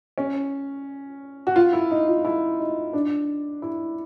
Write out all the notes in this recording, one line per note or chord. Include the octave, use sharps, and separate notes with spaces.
C#4
F#4
F4
E4
D#4
F4
E4
D#4
D4
E4